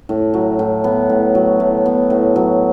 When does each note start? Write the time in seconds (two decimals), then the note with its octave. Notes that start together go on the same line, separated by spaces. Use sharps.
0.09 A2
0.34 F#3
0.59 A2
0.84 B3
1.10 A2
1.35 F#3
1.60 A2
1.86 B3
2.10 A2
2.36 F#3